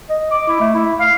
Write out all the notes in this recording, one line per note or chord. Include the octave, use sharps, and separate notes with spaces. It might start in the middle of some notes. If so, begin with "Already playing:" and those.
D#5
D6
E4
A3
E4
F5